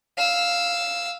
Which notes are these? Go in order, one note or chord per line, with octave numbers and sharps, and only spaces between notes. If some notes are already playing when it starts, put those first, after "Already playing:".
F5 E6